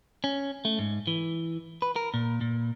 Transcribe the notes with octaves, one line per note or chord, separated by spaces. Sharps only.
C#4
A3
G#2
E3
B4
A#4
A#2
A#2